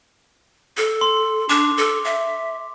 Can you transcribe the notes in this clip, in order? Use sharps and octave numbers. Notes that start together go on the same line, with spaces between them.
A4
C6
D4 D6 F7
A4
E5